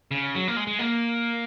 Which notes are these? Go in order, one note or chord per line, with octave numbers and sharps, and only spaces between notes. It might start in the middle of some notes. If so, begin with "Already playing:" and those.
C#3
F#3
A#3
G#3
G#3
A#3